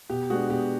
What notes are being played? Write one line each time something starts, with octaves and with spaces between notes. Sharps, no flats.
B2 G4
G#3 B3 D4 F#4
B2 G4